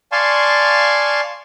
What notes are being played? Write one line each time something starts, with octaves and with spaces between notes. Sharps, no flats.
D5 F5 G#5 A5 C6 C#6